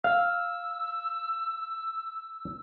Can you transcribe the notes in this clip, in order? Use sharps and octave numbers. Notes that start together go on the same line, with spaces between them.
F5 E6